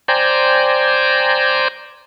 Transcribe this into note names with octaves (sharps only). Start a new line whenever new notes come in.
C5 D5 G5 G#5 A#5